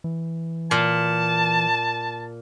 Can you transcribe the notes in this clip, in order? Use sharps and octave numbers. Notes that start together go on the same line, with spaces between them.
E3
A#2 A5